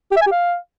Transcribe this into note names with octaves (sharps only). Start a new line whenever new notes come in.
G4
E5
G#5
G4
F5